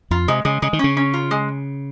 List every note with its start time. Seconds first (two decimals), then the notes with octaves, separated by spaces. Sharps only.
0.11 F2 F4
0.28 C3 G#3
0.45 C#3 G#3
0.62 C#3 G#3
0.73 D#3
0.79 C#3 C#4
0.97 C#4
1.14 F4
1.31 G#3